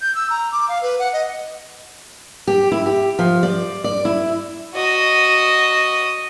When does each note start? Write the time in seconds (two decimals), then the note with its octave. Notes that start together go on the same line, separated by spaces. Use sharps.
0.01 G6
0.15 E6
0.30 A#5
0.52 D6
0.68 F5
0.82 B4
0.99 F#5
1.13 D#5
2.47 G4
2.72 E4
2.86 G4
3.19 F3
3.43 D5
3.84 D5
4.05 E4
4.74 F#4 D#5